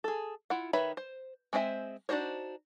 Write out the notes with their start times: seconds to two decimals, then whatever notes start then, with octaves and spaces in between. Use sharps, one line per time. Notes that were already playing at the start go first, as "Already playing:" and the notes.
0.04 G#4 A4
0.50 E4 F4 F#5
0.73 D#3 B4 C#5 E5 B5
0.97 C5
1.53 G#3 C4 C5 E5 G#5
2.09 D4 D#4 F#4 C5 C#5